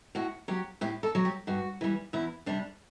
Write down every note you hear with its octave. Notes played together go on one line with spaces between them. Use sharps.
A2 F#4
F#3 G4
A2 G4
A4
F#3
G4
G2 F#4
E3 G3
E2 E4
C3 G3 D4